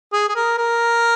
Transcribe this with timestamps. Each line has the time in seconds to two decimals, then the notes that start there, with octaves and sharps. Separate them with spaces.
0.13 G#4
0.29 G#4
0.35 A#4
0.58 A#4